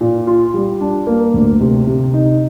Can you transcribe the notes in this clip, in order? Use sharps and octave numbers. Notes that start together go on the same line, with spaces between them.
A#2
F4
G3
D4
A#3
D2
C3
C3
D#4